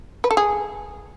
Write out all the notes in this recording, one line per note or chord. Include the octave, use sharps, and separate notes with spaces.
B4
A4
G#4